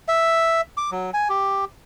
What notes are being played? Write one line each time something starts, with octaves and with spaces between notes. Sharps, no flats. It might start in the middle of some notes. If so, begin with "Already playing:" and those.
E5
D6
F#3
G#5
G4